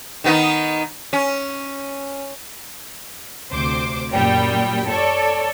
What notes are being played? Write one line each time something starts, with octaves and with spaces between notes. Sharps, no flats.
D#3 B3 D#4
C#4
D2 C3 C5 D6
F#2 A#2 G3 G5
A4 C#5 D5